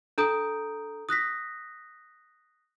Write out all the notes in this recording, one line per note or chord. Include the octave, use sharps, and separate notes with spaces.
D4 A4 A#5 D#6 G6 D7
D#6 F#6 A#6 B6